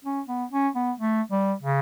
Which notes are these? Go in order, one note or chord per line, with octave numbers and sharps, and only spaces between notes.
C#4
B3
C#4
B3
A3
G3
C#3